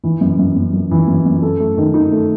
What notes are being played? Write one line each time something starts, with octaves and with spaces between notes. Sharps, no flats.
E3
F#2
F#2
F#2
F#2
E3
F#2
F#2
A4
A3
D#3
D#4
A3